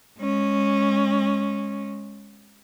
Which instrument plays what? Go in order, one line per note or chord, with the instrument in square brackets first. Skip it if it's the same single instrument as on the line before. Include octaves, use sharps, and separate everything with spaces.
[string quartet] G#3 C#4